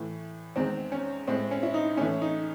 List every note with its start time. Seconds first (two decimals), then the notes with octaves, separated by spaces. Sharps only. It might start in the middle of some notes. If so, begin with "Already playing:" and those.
Already playing: A2 E3 A3
0.56 E2 D#3 G#3 C4
0.92 C#4
1.28 A2 G#3 C4
1.51 C#4
1.63 E4
1.74 D#4
1.97 A2 E3 A3 C#4
2.22 D#4